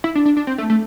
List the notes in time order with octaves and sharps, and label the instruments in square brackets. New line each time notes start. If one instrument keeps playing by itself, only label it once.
[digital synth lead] E4
D4
D4
D4
C4
A3
A3